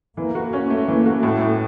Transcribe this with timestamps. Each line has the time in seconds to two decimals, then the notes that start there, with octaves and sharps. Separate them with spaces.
0.17 E3 A#3
0.35 F#4
0.53 C#4
0.70 A3 A#3
0.88 E3
1.06 F#4
1.23 A2 A3
1.41 A2